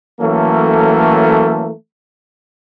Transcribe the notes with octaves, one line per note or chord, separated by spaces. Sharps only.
E3 F#3 A3 A#3 C#4 A4